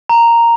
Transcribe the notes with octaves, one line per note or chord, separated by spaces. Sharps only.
A#5